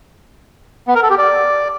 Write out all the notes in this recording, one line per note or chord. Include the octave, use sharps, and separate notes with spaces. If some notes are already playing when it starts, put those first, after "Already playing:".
B3
A#4
A4
G4
D5